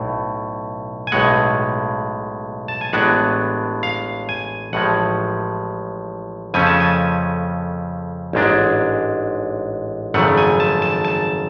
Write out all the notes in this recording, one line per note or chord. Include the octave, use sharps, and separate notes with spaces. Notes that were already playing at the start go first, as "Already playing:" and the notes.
Already playing: B1 A2
G#5
B1 A2 G#3 F#5
A5
G#5
A1 A2 G#3 B3 D4 F#5
F5
G#5
A1 A2 F3 G#3 F#5
F2 C#3 F3 A3 C#4 G#5
A5
G#5
A1 G#2 G#3 D4
G#1 F#2 C#3 F3 A3 F#5
G#5
A5
A5
A5